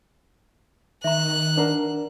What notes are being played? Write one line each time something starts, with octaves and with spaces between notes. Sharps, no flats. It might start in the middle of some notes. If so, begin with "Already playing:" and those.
D#3 E5 A#5 F#6
D4 A#4 B4 F#5 A#5